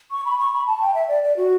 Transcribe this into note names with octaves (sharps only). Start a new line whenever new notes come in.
C#6
B5
C#6
B5
A5
G5
E5
D5
D5
F#4